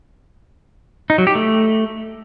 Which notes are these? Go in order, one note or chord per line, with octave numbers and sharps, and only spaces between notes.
D#4
F#3
G4
A3